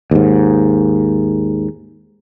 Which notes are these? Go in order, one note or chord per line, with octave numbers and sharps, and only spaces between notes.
D#2 G#2